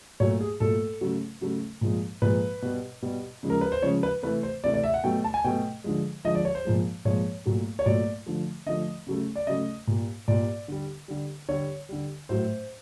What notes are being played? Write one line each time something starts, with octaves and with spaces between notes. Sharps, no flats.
A#2 F#3 A3 C#5
G#4
A#2 F#3 A3 A4
C#3 F#3 A3
C#3 F#3 A3
A#2 F3 G#3
A#2 F3 G#3 B4
B2 G3
B2 G3
C#3 F3 G#3
A#4
B4
C5
C#3 F3 G#3 C#5
B4
C3 E3 A3 B4
C5
C3 E3 A3 D5
D5
E5
F#5
B2 F#3 A3 G5
A5
G#5
B2 F#3 A3 G5
D3 F3 G#3
D3 F3 G#3 D#5
D5
C#5
C5
A#2 F3 G#3
A#2 F3 G#3 C#5
A#2 F#3 A3
C#5
A#2 F#3 A3 D5
D3 F3 A3
D3 F3 A3 D#5
C#3 F#3 A3
D5
C#3 F#3 A3 D#5
A#2 G3
A#2 G3 D5
D3 G3
D3 G3
D3 G3 C#5
D3 G3
A2 F#3 A3 C5